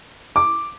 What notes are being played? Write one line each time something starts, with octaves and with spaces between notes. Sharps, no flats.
D6